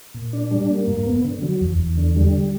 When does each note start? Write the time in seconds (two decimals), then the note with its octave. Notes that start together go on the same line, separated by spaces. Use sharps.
0.14 A#2
0.33 D4
0.51 G3
0.70 A#3
0.88 G2
1.06 B3
1.24 D3
1.42 F#3
1.61 E2
1.79 E2
1.97 D3
2.16 G3